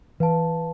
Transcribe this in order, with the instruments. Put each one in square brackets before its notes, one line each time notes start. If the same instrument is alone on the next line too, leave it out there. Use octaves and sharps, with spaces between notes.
[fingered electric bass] E3 [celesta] B4 F5 A5